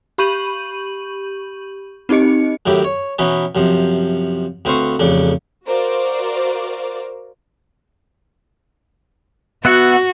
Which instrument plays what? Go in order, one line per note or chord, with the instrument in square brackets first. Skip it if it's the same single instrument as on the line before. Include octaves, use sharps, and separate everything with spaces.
[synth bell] G4 B5 C#6 G6 D#7 F#7
C4 D#4 G4 D#5 C#7
[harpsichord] F#2 A2 D#3 E4 G4
C#5
B2 E3 C#4 D#4 B4
F#2 C3 F3
D2 C4 B4 C5 F5 C#6
A1 F2 C#3 D4
[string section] F#4 A#4 C5 D5 F5
[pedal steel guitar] B3 E5 F#5 [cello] F#4